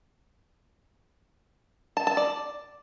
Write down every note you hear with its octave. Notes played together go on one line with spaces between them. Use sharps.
A5
A5
D5